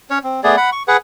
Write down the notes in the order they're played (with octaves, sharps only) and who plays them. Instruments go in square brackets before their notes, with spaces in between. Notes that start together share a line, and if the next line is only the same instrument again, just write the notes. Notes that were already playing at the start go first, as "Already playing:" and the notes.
[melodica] C#4 C#5
C4
A3 B3 G#4 D5
F#5 B5
C#6
G#4 B4 F#5